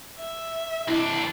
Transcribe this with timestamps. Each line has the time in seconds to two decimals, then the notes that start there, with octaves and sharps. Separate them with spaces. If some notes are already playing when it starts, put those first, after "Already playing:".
0.20 E5
0.88 C2 D4 E4 D#5